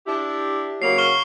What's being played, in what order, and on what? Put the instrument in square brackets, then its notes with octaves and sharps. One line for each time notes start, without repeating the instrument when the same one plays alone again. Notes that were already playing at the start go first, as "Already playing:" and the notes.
[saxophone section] D4 E4 G4
[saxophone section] C#3 F#3 A#3 [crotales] C7 F7
[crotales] C#6 F6 G7